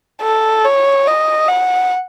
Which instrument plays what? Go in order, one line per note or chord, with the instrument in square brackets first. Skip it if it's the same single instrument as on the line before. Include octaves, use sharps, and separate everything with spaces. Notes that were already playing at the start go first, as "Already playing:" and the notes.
[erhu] A4
C#5
D#5
F#5